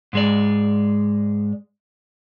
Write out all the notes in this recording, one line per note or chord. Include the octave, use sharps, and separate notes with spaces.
G#2 G#3 D5